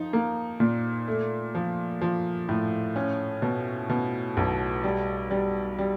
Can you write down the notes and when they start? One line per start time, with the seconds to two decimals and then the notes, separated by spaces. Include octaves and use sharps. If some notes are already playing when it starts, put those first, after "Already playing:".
Already playing: F3 D#4
0.13 A#3
0.60 A#2
1.08 A3
1.55 F3
2.01 F3
2.49 A2
2.96 C#4
3.42 B2
3.89 B2
4.37 B1
4.84 G3
5.31 G3
5.79 G3